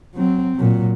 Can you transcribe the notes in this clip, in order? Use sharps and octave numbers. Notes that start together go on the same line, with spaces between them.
F#3 C4
A#2 F#3